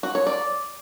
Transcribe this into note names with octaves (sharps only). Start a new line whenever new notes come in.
F#4
C#5
D5